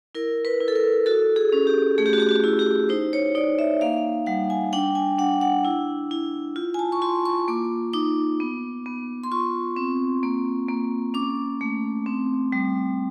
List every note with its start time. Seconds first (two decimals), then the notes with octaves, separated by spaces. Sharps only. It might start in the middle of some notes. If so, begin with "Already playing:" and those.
0.15 E4 A#4
0.45 B4
0.61 E4
0.68 A4
0.75 A#4
1.06 F#4 A4
1.36 G#4
1.52 C#4
1.67 G4
1.98 A3 G#4
2.06 G4
2.13 F#4
2.20 G4
2.29 F#4
2.44 E4
2.59 G4
2.89 D#4 C5
3.13 C#5
3.35 D#4 D5
3.59 E5
3.81 A#3 F5
4.26 G3 F#5
4.50 G#5
4.73 D4 G5
4.95 G#5
5.18 D4 F#5
5.41 F#5
5.65 E4
6.11 E4
6.56 F4
6.74 G#5
6.79 A5
6.92 C#6
7.02 F4 C6
7.25 C#6
7.48 A#3 D6
7.93 D#4 D6
8.40 B3
8.86 B3
9.24 C6
9.32 F4 C#6
9.76 C4
10.23 A#3
10.68 A#3
11.14 C#4 D6
11.61 A3
12.06 C4
12.52 G3